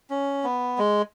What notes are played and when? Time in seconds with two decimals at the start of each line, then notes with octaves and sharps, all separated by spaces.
0.10 C#4
0.44 B3
0.78 G#3